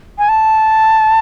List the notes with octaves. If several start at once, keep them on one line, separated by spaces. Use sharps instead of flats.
G#5
A5